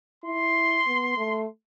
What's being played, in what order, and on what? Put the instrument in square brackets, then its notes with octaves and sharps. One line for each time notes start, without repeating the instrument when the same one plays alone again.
[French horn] E4 [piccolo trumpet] C6
[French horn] B3
A3